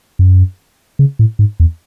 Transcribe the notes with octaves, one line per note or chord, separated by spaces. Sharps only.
F#2
C#3
A2
G#2
E2